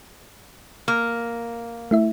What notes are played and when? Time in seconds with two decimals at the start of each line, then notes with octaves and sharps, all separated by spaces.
0.88 A#3
1.91 A3 E4 E5